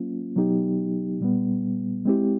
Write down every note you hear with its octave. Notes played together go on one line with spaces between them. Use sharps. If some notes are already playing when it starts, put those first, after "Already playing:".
Already playing: F#3 A#3 C#4 F4
B2 F#3 B3 D#4 G4
A#2 G3 B3
G#3 C4 E4 G4